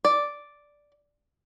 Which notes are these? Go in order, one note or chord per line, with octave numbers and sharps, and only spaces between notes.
D5